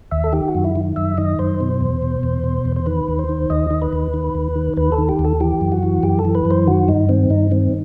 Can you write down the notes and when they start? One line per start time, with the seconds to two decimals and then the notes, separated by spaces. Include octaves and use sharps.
0.11 D#2 E5
0.24 A4
0.33 D#3 G4
0.48 F#4
0.55 F#2
0.64 E4
0.75 D#3
0.96 F#2 E5
1.18 D#3 D#5
1.39 F#2 C5
1.60 B2
1.81 E2
2.02 B2
2.23 E2
2.44 B2
2.65 E2
2.76 C5
2.86 D#3 B4
3.08 D#2
3.19 C5
3.29 D#3
3.50 D#2 D#5
3.71 D#3
3.82 B4
3.93 D#2
4.14 D#3
4.35 D#2
4.56 D#3
4.77 D#2 B4
4.92 A4
4.98 D#3
5.09 G4
5.19 D#2
5.25 A4
5.40 E3 G4
5.61 F#2
5.72 F#4
5.83 E3
6.03 F#2 G4
6.19 A4
6.25 E3
6.35 B4
6.45 F#2
6.51 C5
6.67 D#3 F#4
6.88 G2 D#4
7.09 D#3 C4
7.30 G2 D#4
7.51 D#3 C4